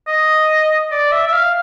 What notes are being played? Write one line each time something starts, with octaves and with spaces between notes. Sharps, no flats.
D#5
D5
E5
E5
F5